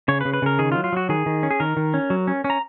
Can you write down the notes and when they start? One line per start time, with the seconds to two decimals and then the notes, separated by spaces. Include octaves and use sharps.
0.08 C#3 C#5
0.21 B4
0.25 C#3
0.34 B4
0.42 C#3 A#4
0.59 D#3 G#4
0.72 F4
0.75 F#3
0.84 F4
0.93 F#3 F#4
1.09 D#3 G#4
1.26 D#3
1.43 C#4
1.51 G#4
1.60 D#3 A#4
1.77 D#3
1.94 C#4
2.10 F#3
2.28 C#4
2.44 C#4
2.50 A#5